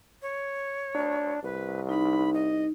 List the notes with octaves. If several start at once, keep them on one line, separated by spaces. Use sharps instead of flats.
C#5
D4
C2 B4
D#4 B5
D#5